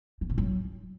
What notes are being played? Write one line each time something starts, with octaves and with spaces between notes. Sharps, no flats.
E3
D3
F#3